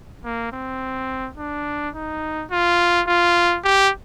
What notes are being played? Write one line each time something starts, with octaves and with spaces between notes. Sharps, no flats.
A#3
C4
D4
D#4
F4
F4
G4